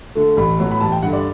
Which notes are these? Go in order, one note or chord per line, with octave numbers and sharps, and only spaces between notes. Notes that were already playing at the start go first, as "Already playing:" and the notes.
D3 A3
A1 B5
A2 F#3 B3
B5
A1 A5
G5
G2 D3 F#5
D5